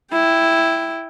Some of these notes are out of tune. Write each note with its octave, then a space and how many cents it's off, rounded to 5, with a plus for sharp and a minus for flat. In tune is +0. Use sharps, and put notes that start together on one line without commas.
E4 +0 G5 +0